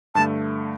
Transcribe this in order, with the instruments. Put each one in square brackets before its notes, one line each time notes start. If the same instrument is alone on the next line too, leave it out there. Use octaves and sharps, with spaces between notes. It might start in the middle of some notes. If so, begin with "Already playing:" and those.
[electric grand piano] G2 D3 A3 [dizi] A5